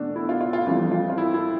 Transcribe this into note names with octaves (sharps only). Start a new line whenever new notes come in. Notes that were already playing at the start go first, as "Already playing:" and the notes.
Already playing: E2 B2 A3 D4
E4
F4
F4
F4
F2 E3 G3 F4
F4
F4
E4
E4